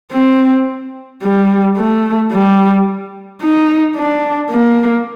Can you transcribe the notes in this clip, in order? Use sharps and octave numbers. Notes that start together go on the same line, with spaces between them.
C4
G3
A3
G3
D#4
D4
A#3